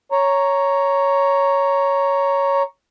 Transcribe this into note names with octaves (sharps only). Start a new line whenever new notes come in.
C#5 A#5